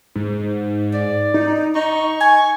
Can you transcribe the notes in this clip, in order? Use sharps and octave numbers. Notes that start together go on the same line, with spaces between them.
G#2
D5
D#4
D#4 C#6
G#5